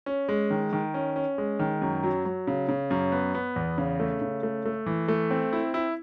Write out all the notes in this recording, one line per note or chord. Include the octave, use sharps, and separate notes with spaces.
C#4
G#3
D#3
D#3
C#4
C#4
G#3
D#3
F#2
F#3
F#3
C#3
C#3
F#2
B3
B3
E2
C#3
A3
C#3
A3
A3
E3
A3
C4
E4
E4